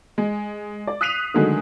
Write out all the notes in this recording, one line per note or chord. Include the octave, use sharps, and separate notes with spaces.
G#3
D5
D#6 F#6 B6 C7 D#7 F7
D3 D#3 F#3 G#3 A3